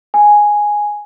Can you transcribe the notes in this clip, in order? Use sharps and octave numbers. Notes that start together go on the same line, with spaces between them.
G#5